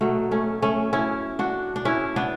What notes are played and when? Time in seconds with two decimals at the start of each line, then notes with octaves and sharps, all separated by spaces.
0.01 B2 F#3 A3
0.31 A3 C#4
0.62 A3 C#4
0.93 C#4 E4
1.39 D4 F#4
1.76 D4
1.85 C#4 E4
2.16 B3 D4